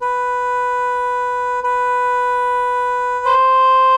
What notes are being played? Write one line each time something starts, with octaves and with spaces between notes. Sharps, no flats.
B4
B4
C5